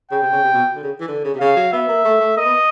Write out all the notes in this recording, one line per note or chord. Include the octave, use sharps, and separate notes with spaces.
C#3 G5
C3
C#3
C3
B2
D3
C#3
E3
D3
C#3
C3
C#3 F5
F#3
B3 E5
A#3
A3
A3
A#3 D#5
B3